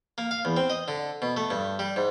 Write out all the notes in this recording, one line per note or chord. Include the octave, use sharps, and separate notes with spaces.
A#3
F5
E2
C4
D#5
D3
B2
A3
G2
G3
G#2